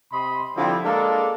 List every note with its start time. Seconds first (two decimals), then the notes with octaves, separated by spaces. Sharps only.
0.12 C3 D#5 B5 C6
0.56 D3 F3 G3 C4 E4 G4
0.84 G#3 A#3 D4 A4